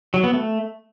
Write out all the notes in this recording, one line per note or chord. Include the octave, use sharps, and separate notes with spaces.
F#3
B3
A3